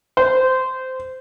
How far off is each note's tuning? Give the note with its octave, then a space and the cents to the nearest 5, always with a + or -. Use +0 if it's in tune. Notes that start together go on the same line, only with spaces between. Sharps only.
C5 -15